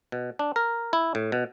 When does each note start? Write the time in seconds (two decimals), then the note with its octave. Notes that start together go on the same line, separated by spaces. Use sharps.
0.12 B2
0.39 D4
0.56 A#4
0.93 E4
1.15 A2
1.32 B2